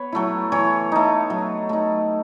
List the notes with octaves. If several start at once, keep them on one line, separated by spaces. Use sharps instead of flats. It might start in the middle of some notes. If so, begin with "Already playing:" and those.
Already playing: B3 B4 C#5
F#3 A3 E4
E3 C#5
A3 D#4
F#3
A3 D#4